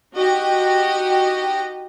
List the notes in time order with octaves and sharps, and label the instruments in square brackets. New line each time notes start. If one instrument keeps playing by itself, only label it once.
[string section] D#4 F#4 G4 D#5